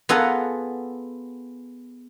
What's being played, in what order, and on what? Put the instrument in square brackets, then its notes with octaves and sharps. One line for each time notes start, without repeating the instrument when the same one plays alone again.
[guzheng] B3 F4 G#4 A4 F#5 A#5